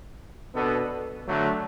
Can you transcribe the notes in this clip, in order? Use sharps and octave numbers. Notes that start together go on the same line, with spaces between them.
B2 B3 D4 A4
D3 F#3 A3